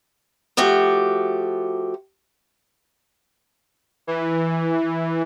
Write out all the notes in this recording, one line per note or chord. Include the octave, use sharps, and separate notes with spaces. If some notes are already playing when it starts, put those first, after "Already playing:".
F3 A3 F#4 G4
E3